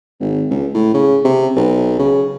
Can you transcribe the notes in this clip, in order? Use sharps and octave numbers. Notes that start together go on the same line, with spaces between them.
G#1
C#2
A2
C#3
C3
B1
C#3